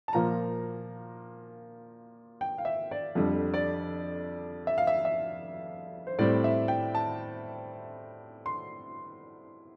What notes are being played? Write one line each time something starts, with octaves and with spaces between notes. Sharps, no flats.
A5
A#2 F3 A#3 A#5
G5
F5
E5
D5
F2 D3 G3
D5
E5
F5
E5
E5
C5
A2 G3 C4 D5
E5
G5
A5
C6